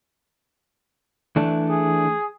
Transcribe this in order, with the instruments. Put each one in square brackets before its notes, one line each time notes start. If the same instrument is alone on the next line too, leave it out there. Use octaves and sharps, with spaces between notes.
[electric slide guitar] E3 A3 D4
[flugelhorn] G#4